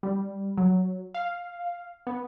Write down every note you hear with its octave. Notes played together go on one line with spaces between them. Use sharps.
G3
F#3
F5
B3